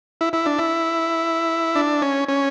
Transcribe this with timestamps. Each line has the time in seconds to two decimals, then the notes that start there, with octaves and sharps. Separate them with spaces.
0.21 E4
0.33 E4
0.46 D4
0.59 E4
1.75 D4
2.02 C#4
2.28 C#4